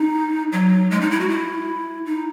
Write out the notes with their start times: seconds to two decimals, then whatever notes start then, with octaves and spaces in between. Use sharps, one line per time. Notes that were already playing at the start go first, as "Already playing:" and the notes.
Already playing: D#4
0.52 F#3
0.91 G#3
1.01 D#4
1.11 E4
1.20 F#4
1.30 E4
2.06 D#4